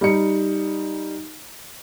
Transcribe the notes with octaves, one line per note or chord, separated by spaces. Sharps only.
G3 D#4 C#7